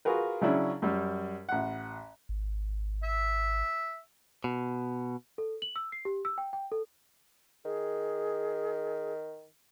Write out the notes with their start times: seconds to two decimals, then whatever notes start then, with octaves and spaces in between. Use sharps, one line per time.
0.05 F4 F#4 G#4 A#4 B4
0.41 C#3 F#3 C#4 D4 E4
0.82 F#2 G3
1.49 A1 F#5
2.29 G#1
3.04 E5
4.44 B2
5.38 A4
5.62 F#7
5.76 E6
5.92 C7
6.05 G4
6.25 E6
6.38 G5
6.53 G5
6.72 A4
7.65 D#3 G#4